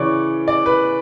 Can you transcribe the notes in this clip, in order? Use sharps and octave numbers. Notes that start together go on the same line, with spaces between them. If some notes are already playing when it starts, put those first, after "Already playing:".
Already playing: C#3 E3 C#5 D5
D5
B4